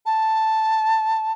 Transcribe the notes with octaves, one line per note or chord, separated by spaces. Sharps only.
A5